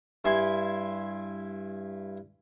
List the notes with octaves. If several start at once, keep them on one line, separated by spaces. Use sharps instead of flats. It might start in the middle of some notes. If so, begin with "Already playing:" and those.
G2 E4 G#5 C6